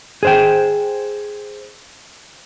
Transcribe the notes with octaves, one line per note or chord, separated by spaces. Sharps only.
G#4 C5 G5